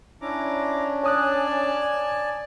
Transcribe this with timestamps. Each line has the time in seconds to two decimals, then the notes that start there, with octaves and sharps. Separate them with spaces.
0.21 C#4 D4 E4 A#5 D6
1.03 C#5 D5 G#5 A5 D#6 F#6